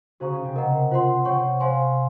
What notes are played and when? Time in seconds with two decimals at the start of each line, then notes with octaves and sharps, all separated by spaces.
0.20 C#3 C#4 F#4 C5 F5 A#5 C#6
0.32 C#3 C#4
0.44 C3 C4
0.56 A#4 D#5 F#5 A#5
0.91 F4 C5 F#5 C6
1.25 C3 C4 C#5 F#5 C#6
1.60 C5 F5 G#5 C6